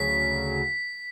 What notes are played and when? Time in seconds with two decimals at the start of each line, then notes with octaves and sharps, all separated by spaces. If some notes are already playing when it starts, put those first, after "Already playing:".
Already playing: D2 C#3 F#3 B6